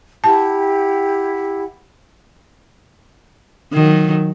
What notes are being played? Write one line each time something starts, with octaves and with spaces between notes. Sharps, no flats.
E4 G4 F#5 A5
D#3 F#3